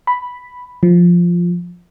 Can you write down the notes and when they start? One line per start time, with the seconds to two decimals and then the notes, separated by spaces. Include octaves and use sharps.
0.07 B5
0.83 F3